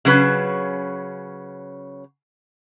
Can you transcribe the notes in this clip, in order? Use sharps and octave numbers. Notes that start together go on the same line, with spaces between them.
C#3 F#3 C#4 B4